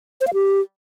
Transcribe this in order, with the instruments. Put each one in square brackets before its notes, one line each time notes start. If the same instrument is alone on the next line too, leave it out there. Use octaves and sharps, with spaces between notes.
[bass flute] C5
F5
G4